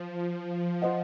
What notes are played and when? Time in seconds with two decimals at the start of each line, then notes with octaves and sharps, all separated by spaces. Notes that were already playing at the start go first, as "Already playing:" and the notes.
Already playing: F3
0.82 F4 C5 D#5 F#5